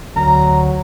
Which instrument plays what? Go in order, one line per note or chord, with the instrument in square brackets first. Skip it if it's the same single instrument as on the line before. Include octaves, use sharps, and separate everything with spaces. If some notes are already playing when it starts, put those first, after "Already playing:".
[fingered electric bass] D2 [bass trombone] F#3 [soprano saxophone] A#5